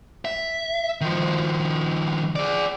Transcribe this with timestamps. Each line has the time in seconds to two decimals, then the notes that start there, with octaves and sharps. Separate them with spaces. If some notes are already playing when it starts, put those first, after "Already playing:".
0.25 E5
1.01 D#3 F3
2.36 G#4 D5